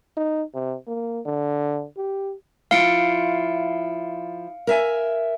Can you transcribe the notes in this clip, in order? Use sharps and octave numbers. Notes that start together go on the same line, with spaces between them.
D#4
C3
A#3
D3
G4
F3 E4 F4 F5 C#7 D7
A#4 E5 G#5